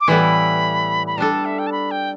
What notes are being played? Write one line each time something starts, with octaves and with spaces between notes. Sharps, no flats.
D6
A2 E3 G3 B3 E4 B5
B5
G3 D4 A4 A5
A5
E5
G5
A5
B5
G5